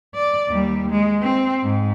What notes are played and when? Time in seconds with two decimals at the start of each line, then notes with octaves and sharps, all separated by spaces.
0.15 D5
0.49 D#2 G3
0.91 G#3
1.22 C4
1.63 G#2